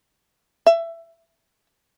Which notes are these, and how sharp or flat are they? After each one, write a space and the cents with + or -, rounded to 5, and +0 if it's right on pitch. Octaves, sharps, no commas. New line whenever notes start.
E5 +15